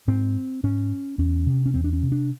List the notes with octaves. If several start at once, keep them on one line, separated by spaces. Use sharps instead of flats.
G#2 C4
G#2 C#4
E2 C#4
C3
C#4
E2 C4
D4
C#4
C3
D4